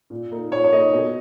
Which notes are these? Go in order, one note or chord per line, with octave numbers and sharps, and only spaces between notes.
A#2
A#3 D#4
A#2 C#5
C#5
A#3 D#4 D#5
B2